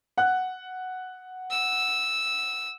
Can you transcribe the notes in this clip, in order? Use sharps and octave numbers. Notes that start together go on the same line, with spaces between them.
F#5 F#6
E6